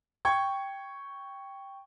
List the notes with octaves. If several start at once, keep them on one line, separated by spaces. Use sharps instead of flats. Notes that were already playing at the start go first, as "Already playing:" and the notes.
G5 C#6 G#6